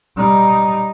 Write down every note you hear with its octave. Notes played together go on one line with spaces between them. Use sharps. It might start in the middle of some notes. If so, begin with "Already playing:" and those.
G3 D#4